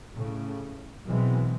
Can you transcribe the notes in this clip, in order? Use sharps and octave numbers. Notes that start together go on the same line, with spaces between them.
A2 C#3
B2 E3 F#3 G#3 B3 C4